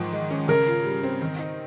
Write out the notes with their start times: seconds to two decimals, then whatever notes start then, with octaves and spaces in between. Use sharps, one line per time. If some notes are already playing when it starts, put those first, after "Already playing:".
Already playing: G#2 D#3 F3
0.12 G#3
0.30 C#4
0.48 C#3 A#4
0.67 F4
0.84 G3
1.03 C4
1.21 D#3
1.39 D#4